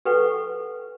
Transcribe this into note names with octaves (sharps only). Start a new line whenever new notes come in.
G4 A4 B4 F#5 C#6